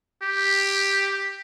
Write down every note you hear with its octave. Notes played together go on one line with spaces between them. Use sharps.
G4